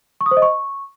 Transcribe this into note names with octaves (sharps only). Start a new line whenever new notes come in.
C#6
D#6
C5
D#5
C#6